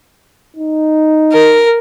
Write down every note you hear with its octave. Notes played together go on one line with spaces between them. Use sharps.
D#4
A#4